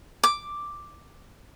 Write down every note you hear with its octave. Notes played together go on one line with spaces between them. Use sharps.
D6